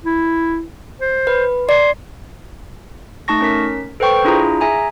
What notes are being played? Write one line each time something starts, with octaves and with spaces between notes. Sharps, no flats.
E4
C5
B4
D5 C6
A3 D#4 A5 C#6 A#6
C#4 A#4 B6
A4 B4 C5 G5 C#6
D4 E4 F4 G#4 A#5
G#4 E5 G#5 A#5